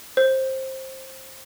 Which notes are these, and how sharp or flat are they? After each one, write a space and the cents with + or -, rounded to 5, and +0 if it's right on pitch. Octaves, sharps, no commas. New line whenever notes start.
C5 +15